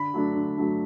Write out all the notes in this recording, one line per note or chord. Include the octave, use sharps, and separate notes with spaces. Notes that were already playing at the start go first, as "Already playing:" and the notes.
Already playing: D3 B5
F#3 A3 D4
D3
F#3 A3 D4